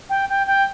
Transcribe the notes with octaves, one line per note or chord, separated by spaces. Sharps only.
G5
G5
G5